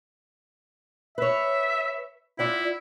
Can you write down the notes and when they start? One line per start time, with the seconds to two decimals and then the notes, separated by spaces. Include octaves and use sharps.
1.18 B4 C#5 E5
2.39 E4 F4 D5 F#5